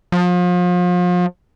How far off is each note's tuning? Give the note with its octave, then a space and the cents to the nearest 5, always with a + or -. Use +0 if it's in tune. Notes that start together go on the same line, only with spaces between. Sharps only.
F3 +35